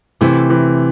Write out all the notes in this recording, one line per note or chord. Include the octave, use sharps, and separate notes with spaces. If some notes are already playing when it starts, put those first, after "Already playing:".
C3 E3 A3 E4
E3